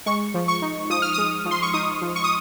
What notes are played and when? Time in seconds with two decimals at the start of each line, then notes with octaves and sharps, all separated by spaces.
0.06 G#3 C#6
0.34 F3
0.48 C#6
0.62 D#4
0.90 F3 D#6
1.02 F6
1.14 G#3 D#6
1.45 F3
1.51 C6
1.62 C#6
1.73 D#4 D#6
2.02 F3
2.16 C#6
2.24 D#6